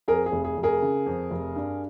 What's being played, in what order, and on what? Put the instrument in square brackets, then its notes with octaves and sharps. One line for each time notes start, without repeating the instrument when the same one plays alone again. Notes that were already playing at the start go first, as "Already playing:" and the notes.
[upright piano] F2 G#4 A#4
G#4
F1
G#4
F1
G#4 A#4
C#3
F2
F1
G2